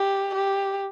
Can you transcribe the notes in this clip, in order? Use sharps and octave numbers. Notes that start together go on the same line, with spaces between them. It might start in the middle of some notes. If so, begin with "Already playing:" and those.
Already playing: G4
G4